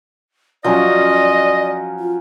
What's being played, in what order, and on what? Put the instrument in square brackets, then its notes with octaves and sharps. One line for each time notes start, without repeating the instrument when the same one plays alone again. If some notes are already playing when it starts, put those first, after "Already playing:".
[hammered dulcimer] F3 F#3 C#4 [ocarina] D5 [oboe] D#5
[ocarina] F4